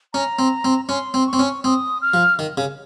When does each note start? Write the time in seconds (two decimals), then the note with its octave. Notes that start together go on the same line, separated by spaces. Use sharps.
0.13 C#4 A#5
0.39 C4
0.64 C4
0.89 C#4 C6
1.14 C4
1.27 C#6
1.33 C4
1.39 C#4
1.64 C4 D#6
2.02 F6
2.14 F3
2.39 D#3
2.57 C#3